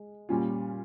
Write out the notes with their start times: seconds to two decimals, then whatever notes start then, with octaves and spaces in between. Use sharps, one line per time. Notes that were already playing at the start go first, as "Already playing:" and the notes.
Already playing: G#3
0.29 A#2 G3 C#4 F4